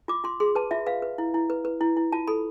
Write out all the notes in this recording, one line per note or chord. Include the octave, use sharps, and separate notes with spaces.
F4 D6
F4 C6
G#4 C6
B4 A5
F4 E5
B4 F5
B4
E4
E4
B4
B4
E4
E4
F4 A5
A4 B5